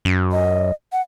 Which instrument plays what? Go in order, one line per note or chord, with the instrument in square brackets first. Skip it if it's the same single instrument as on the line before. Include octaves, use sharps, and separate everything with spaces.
[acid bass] F#2
[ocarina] D#5
F#5